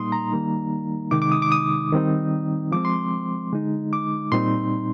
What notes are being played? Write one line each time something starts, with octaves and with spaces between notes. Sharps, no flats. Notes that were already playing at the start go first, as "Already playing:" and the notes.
Already playing: A#2 G3 A#3 D#4 C6 D#6
A#5
D#3 G3 A#3 D#4
C3 D#3 G#3 D#4 D6
D6
D#6
D6
D#6
D#3 G3 C4 D#4
F3 G#3 C4 D6
C6
D3 G#3 D#4
D6
A#2 G3 C4 D#4 C6